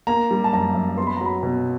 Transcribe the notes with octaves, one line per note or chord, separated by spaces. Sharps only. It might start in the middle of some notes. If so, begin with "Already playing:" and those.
A#3 A#5
G3
A5
F#2 A#5
F#2
B3 C6
B5
F#3 A#5
B5
B2